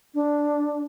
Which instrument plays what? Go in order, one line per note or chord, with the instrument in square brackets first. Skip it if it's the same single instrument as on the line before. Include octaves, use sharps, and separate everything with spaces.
[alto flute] D4